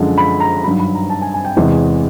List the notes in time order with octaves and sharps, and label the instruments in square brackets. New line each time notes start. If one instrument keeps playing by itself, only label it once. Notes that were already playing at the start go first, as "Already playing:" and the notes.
Already playing: [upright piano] F#2 D3 F3 G#3
B5
A#5
G2 D#3 F#3 B5
B5
A#5
A5
G#5
G#5
G5
E2 C3 E3 G#3